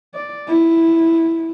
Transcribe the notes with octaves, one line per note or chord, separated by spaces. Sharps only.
D5
E4